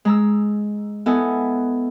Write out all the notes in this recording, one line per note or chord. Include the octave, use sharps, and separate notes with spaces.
G#3 A#5 E6
B3 E4 A4 D#5 G#5